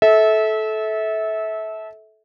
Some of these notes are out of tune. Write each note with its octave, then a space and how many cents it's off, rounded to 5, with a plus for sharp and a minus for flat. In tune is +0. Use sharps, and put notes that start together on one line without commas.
A4 -20 E5 -25